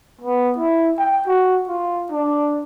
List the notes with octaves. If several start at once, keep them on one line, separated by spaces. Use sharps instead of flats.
B3
E4
G5
F#4
F4
D4